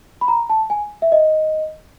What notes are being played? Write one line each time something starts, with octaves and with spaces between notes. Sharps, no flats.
B5
A#5
A5
G#5
E5
D#5